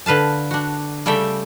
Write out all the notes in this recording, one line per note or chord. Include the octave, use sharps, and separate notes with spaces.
D3 B4 F5 A5
D4 F#4
C#3 G3 A3 A4 E5 G5